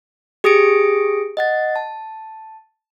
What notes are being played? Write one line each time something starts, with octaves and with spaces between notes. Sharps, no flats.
G4 G#4 D#6 A#6 C#7 D7
D#5 F#5 A6
A5